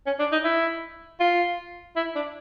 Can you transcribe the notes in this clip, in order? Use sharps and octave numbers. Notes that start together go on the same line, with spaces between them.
C#4
D4
D#4
E4
F4
E4
D4